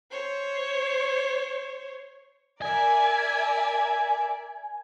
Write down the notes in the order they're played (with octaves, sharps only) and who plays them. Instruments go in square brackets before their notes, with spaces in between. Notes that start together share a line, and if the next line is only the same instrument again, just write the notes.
[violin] C5 C#5
[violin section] A#4 D5 E5 [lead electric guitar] G#5